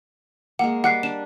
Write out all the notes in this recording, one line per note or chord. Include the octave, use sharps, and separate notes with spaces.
G#3 A#3 F#5
G3 F#5 D6 F#6 C7
D4 E7